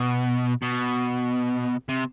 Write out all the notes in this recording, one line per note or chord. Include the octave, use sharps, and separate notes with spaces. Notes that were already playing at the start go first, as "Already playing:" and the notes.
Already playing: B2
B2
C3